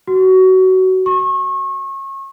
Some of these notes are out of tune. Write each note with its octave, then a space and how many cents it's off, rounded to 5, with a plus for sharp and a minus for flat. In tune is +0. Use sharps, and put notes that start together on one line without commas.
F#4 +20
C#6 -30